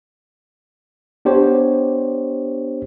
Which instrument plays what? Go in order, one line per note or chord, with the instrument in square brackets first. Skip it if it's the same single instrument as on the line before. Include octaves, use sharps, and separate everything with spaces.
[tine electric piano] B3 D4 G4 C5 C#5